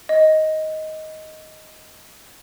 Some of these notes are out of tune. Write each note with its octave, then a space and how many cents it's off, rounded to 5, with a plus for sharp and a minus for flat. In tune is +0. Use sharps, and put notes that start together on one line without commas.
D#5 +10